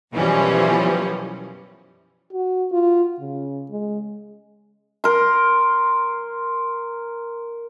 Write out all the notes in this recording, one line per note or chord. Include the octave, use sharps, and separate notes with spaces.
F#2 B2 E3 F3 G3 C#4
F#4
F4
C#3
G#3
A#4 C6